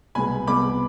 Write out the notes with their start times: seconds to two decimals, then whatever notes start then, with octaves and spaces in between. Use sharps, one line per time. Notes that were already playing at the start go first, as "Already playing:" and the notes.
0.15 C2 B2 G#3 B3 G#5 B5
0.47 C2 B2 G#3 B3 B5 D6